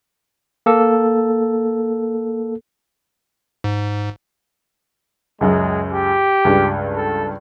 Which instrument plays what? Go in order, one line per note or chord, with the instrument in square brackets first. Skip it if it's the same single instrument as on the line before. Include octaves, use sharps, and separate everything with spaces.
[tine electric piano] A#3 A4
[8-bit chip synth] G#2
[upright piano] C#2 F#2 [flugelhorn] G#3
[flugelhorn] G4
[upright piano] C#2 G2
[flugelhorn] A4